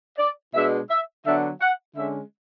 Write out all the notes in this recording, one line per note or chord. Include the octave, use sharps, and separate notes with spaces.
D5
B2 G#3 D4 E5
E5
D3 F#3 B3 D4 E5
F#5
D3 G#3 C#4 E5